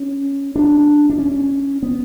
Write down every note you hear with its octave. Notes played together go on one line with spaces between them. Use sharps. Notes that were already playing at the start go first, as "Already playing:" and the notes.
Already playing: C#4
D4
D4
C#4
B3